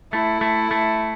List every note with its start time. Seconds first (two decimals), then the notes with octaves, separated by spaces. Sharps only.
0.13 A3 E4
0.41 A3
0.71 A3